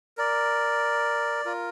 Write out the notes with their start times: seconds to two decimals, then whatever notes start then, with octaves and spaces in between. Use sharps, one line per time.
0.18 A#4 D5
1.45 F4 A#4